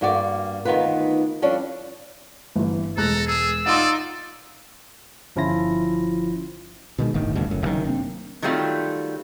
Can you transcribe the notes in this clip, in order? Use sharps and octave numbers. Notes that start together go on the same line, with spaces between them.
G2 A#3 F#4 G4 D5
D2 D#3 B3 D#4 F4 B4
F3 G3 C#4 D4
G1 E3
E1 G#3 A4 A#5 F#6
G#4 E6
D#4 F4 D5 F#5 C6
G1 F3 C#4 E4 F4 A#6
B2 D#3 G#3
D1 G1 A2 D#3
D#1 D2 G2 B2
F#1 F#2 A2
F#1 C3 D#3 F#3
A#3 C4 D4
D#3 F#3 G3 A3 C4 F4